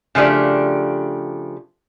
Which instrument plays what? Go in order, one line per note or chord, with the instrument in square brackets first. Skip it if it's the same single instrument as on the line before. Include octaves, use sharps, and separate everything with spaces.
[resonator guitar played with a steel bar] C#3 F3 A3 D4 G4